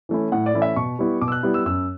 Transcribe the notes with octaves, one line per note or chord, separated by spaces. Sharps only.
E3 A3 C#4 E4
A2 F#5
D5
E3 A3 C#4 E4
E5
B2 C#6
G3 B3 E4
B2 D6
E6
F#6
G3 B3 E4
E6
F#2 E6